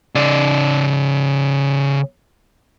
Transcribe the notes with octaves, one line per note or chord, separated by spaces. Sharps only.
C#3 D5